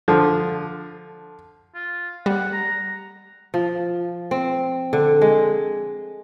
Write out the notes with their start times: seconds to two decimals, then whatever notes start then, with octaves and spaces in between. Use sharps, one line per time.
0.08 D3 F3
1.75 F4
2.26 G3 F#5
2.53 A#5
3.54 F3
4.31 C4
4.93 D3
5.21 G#3